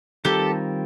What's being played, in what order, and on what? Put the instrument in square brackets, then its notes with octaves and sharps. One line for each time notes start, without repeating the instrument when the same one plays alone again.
[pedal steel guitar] D#3 G3 C4 F4 A#4 [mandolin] G4 A4